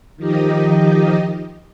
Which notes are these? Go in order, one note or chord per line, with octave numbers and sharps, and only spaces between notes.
D#3 F3 D#4 G4 D#5